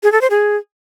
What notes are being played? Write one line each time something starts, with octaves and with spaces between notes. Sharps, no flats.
G#4
A4
C5
G#4